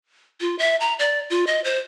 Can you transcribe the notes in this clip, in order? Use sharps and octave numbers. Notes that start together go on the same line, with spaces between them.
F4
E5
A#5
D5
F4
D#5
C5